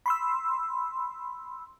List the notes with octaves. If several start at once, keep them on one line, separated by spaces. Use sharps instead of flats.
B5 C6 E6